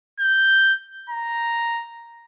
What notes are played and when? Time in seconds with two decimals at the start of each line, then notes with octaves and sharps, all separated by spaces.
0.20 G6
1.10 A#5